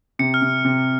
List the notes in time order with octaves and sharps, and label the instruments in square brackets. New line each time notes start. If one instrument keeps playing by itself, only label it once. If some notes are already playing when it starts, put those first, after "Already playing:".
[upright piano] C3 [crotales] C#7
[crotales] F6
[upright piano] C3
C3